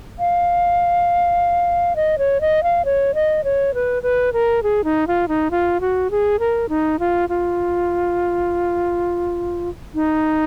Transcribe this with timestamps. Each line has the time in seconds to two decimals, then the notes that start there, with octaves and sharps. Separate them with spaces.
0.19 F5
1.96 D#5
2.18 C#5
2.41 D#5
2.63 F5
2.85 C#5
3.15 D#5
3.44 C#5
3.74 B4
4.03 B4
4.33 A#4
4.63 G#4
4.84 D#4
5.07 F4
5.28 D#4
5.51 F4
5.81 F#4
6.11 G#4
6.40 A#4
6.69 D#4
7.00 F4
7.29 F4
9.95 D#4